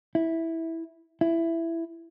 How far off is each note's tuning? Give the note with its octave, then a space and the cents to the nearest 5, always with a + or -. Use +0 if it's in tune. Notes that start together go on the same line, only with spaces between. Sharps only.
E4 -10
E4 +10